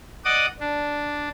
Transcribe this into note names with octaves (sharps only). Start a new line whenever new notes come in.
D5 D#5 F#5 D6 D#6
D4